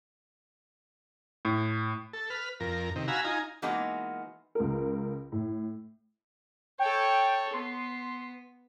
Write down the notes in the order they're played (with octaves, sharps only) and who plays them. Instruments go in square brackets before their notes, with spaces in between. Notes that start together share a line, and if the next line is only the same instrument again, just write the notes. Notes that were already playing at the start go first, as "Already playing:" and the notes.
[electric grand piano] A2
[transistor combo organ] A4
B4 F6
F2 A#4
C3 D#3
F#4 F5 G#5 A#5 B5 E6
D#4 F4 G#5 A#5
[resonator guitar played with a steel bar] E3 G#3 A#3 B3 D#4 F#4
[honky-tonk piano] C#2 A#4
A2
[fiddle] A4 C#5 [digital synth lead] G5
[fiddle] B3 [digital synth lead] C6